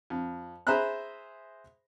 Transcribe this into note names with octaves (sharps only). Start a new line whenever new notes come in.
F2
G#4 C5 E5 A#5 B5 F#6